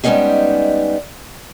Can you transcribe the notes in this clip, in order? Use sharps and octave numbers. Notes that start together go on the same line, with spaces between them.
G3 G#3 B3 C#4 D#4 G#4